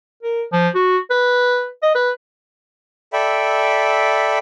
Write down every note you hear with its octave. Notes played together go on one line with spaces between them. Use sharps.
A#4
F3
F#4
B4
D#5
B4
A4 D5 E5 G5 B5